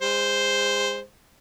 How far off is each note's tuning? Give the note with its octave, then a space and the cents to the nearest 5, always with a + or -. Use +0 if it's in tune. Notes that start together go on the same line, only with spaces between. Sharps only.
G#3 -35 C5 +0